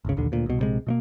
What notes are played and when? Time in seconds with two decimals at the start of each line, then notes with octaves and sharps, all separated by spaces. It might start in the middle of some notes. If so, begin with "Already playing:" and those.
0.05 G1 C#2 C#3
0.17 A#1 D#2 D3
0.32 D2 A#2
0.46 C2 B2
0.59 A#1 C3 G#3
0.87 B2 A3 A#3